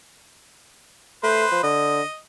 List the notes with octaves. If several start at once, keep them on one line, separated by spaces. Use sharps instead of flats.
A3 B4 C5
F3
D3 D#5